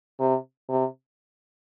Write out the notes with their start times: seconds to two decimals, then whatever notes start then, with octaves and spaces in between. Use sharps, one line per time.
0.20 C3
0.69 C3